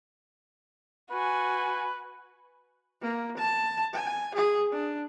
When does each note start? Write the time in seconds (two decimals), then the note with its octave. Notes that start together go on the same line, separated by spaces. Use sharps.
1.11 F#4 B4 G#5
3.02 A#3
3.37 A5
3.93 G#5
4.35 G#4
4.72 D4